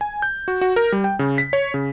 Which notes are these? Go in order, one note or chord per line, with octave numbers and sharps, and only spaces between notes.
G#5
G6
F#4
F#4
A#4
G3
G5
C#3
B6
C#5
C#3